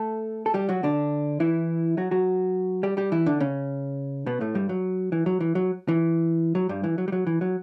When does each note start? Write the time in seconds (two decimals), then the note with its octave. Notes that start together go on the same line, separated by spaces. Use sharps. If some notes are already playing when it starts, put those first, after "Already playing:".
Already playing: A3 A4
0.46 A4
0.54 G3 G4
0.69 F#3 F#4
0.83 D3 D4
1.40 E3 E4
1.97 F#3 F#4
2.11 F#3 F#4
2.83 G3 G4
2.97 G3 G4
3.12 E3 E4
3.26 D3 D4
3.40 C#3 C#4
4.26 B2 B3
4.41 A2 A3
4.55 G2 G3
4.69 F#3
5.12 E3
5.26 F#3
5.40 E3
5.55 F#3
5.88 E3
6.55 F#3
6.69 G2 G3
6.84 E3
6.98 F#3
7.08 G3
7.12 F#3
7.27 E3
7.41 F#3